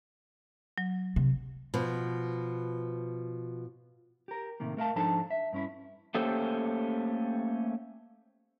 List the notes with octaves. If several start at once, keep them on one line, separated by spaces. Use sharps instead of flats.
F#3
C3
B2 F3
G4 A#4
A2 C3 D#3 A#3
A3 A#4 F5 A5
G#2 F3 D4 D#4 A4 A5
E5
G2 C#4 E4
A3 A#3 C#4 G4 A4 C5